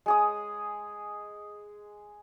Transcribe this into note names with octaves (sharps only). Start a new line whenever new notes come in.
G#3 G#4 D#6